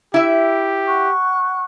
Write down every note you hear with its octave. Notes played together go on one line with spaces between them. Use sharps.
E4 G4 E5
F#5 C#6 F#6